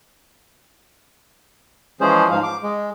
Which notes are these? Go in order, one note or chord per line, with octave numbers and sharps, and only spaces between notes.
E3 F3 G#3 C#4 G#4 C5
G#2 F3 F5
D6
G#3